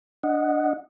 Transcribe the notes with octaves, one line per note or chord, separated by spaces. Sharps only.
D4 D#5 F#5